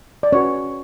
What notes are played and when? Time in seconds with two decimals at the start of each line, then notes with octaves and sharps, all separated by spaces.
0.23 D5
0.32 C#4 F#4 B4 C#5